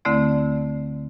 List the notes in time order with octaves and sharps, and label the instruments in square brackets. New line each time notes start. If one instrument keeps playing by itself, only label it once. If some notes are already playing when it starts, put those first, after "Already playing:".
[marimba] D2 D3 A3 C4 E4 D5